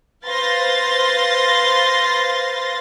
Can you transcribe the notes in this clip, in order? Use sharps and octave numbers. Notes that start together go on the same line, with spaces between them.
B4 C5 F5 C6 A6 A#6